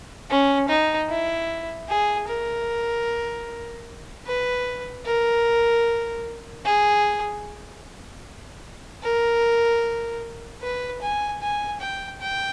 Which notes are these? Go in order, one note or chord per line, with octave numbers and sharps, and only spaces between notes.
C#4
D#4
E4
G#4
A#4
B4
A#4
G#4
A#4
B4
G#5
G#5
G5
G5